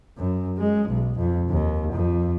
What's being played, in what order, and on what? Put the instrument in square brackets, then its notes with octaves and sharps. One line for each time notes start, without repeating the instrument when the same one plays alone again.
[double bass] F#2
G#3
B1
F2
D#2
F2